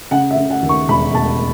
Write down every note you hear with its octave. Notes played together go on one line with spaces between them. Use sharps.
C#3 F#5
E5
C#3
F#5
D#2
C#6
E1 B5
E1 A5